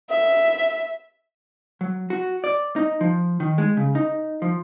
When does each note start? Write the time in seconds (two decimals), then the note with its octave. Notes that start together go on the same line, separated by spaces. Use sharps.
0.10 E5
1.81 F#3
2.10 F#4
2.44 D5
2.76 D#4
3.01 F3
3.40 D#3
3.58 G#3
3.77 C#3
3.95 D#4
4.42 F3